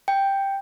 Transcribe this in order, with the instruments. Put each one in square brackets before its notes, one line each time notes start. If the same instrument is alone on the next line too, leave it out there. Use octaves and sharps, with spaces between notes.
[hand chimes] G5